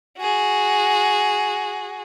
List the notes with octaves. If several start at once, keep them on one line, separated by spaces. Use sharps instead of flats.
F#4 G#4